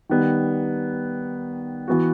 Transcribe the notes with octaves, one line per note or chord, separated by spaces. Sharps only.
D#3 G3 B3
E3 B3 F#4